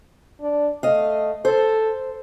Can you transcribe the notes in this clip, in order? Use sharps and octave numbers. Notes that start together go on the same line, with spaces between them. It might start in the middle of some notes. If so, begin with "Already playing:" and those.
D4
A3 D#5 F5
A4 C5